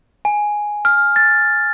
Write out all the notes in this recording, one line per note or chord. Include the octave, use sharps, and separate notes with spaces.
G#5
F6
A6